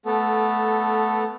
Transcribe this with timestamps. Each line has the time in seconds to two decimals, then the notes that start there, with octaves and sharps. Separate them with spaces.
0.06 A3 B3 A4